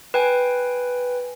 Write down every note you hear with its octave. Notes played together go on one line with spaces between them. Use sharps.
B4 G5 G#5